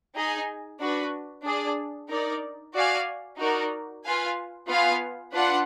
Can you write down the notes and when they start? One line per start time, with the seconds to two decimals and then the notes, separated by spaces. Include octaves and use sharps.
0.15 D#4 G#4 D#5 G#5
0.80 D4 F#4 B4
1.44 D4 G#4 D5
2.10 D#4 A#4 D5
2.74 F#4 D5 F5 G#5
3.39 D#4 F#4 A#4 D5
4.05 F4 B4 F5 G#5
4.69 B3 F4 B4 F5 G#5
5.33 D4 F4 B4 F#5